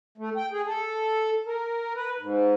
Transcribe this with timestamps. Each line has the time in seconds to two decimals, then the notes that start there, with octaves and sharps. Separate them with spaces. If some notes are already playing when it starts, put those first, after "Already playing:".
0.18 A3
0.37 G5
0.52 G#4
0.66 A4
1.47 A#4
1.96 B4
2.19 G#2